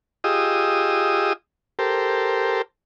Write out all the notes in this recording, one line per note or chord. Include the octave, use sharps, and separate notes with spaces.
F4 G4 G#4 D#5 D#6 E6
G4 A4 A#4 C5